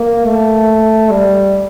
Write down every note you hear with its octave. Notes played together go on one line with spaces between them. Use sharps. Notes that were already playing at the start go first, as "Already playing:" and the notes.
Already playing: A#3
A3
G3